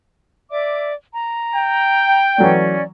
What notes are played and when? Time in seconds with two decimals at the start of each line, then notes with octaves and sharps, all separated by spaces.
0.50 D5 E5 D6
1.12 A#5
1.53 G5
2.38 E3 F#3 A3 C#4 D5